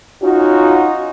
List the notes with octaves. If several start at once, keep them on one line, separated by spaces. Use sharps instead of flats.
C#4 D#4 F4 F#4